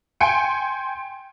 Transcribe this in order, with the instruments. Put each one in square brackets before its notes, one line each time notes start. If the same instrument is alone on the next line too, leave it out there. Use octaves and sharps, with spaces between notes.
[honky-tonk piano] G5 G#5 C6 C#7 D7